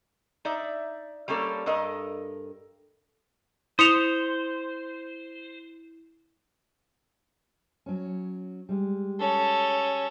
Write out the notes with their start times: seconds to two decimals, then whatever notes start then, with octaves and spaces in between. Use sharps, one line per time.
0.45 D#4 D5 E5
1.28 G3 A#3 C#4 A4 D5
1.66 G2 A4 A#4 D#5
3.79 E4 C5 D#6 C#7 F7
7.86 F#3 C#4
8.69 G3 G#3
9.20 C#4 A4